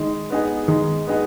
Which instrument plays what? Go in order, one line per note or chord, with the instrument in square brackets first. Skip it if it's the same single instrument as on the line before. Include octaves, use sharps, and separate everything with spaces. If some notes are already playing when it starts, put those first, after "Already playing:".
Already playing: [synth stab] D#3 [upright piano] G#3
[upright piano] B3 D#4 G#4
[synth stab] D#3 [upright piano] G#3
[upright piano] B3 D#4 G#4